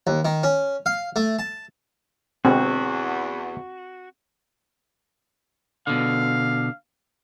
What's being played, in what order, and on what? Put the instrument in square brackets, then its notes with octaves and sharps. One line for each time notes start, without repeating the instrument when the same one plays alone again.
[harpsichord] D#2
D#3
C#4
F5
A3
A5
[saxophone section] E2 [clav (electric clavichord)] B2 D3 G#3 [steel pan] C4 [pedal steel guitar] F#4
[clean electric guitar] B2 D3 [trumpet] F5